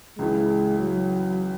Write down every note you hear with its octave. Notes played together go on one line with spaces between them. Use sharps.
C#2 C#3 E3 G#3
F#3